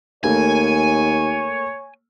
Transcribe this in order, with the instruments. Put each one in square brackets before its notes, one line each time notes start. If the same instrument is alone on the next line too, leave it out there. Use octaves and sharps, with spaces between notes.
[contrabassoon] D#2 [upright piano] A3 A#3 [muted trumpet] C#5 [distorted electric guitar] G#5